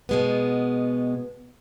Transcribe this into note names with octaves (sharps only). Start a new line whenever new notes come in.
B2 G#3 B3